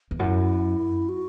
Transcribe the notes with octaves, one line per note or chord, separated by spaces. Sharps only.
E2
F#2 E4
F#4